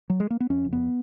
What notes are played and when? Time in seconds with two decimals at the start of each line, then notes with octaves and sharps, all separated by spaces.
0.10 F#3
0.20 G#3
0.30 A#3
0.40 B3
0.50 F2 C#4
0.65 F#1
0.73 B3